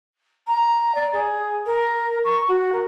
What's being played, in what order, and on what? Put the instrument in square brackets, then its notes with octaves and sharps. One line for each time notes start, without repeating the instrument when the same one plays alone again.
[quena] A#5
D5
G#4
A#4
C#6
F#4
A#4